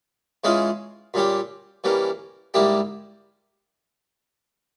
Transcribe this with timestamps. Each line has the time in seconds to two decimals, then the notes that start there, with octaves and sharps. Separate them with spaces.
0.44 E3 G#3 C#4 F4 G#4
1.14 A#2 G3 C#4 G4
1.84 E3 G3 A#3 C#4
2.54 G#2 G3 A#3 E4 G4